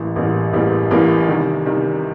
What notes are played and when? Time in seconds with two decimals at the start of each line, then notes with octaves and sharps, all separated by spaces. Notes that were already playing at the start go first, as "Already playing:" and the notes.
Already playing: A1 A2 E3 G3 A#3
0.16 A1 A2 E3 G3 A#3
0.53 A1 A2 E3 G3 A#3
0.91 A1 A2 E3 G3 A#3
1.28 C3 D#3 G3
1.66 C3 D#3 G3